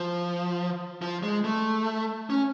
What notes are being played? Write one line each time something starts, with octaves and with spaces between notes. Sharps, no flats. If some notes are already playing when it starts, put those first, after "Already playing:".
Already playing: F3
F3
G#3
A3
C#4